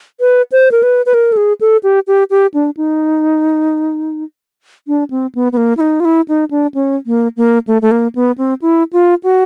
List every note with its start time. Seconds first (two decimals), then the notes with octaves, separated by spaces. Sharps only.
0.20 B4
0.52 C5
0.72 A#4
0.83 B4
1.06 B4
1.14 A#4
1.32 A4
1.37 G#4
1.61 A4
1.83 G4
2.07 G4
2.30 G4
2.54 D4
2.77 D#4
4.88 D4
5.10 C4
5.35 B3
5.52 B3
5.57 A#3
5.77 E4
5.81 D#4
6.00 F4
6.05 E4
6.28 D#4
6.51 D4
6.74 C#4
7.06 A#3
7.37 A#3
7.67 A3
7.82 A3
7.91 A#3
8.15 B3
8.38 C4
8.62 E4
8.93 F4
9.23 F#4